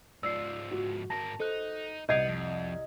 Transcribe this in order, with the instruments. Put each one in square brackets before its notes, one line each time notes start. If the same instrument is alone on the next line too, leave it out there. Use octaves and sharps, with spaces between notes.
[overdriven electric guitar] G#2 F3 [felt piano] D5 [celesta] E6 C7
[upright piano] F#4
[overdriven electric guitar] G#2 A#4 [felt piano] A5 [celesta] A#6
[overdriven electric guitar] D#4 [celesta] A4 F#6 [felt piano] C5
[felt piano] C2 G#6 D7 [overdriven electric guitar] B3 [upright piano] D#5 [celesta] G6 C7 F7
[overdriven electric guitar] F2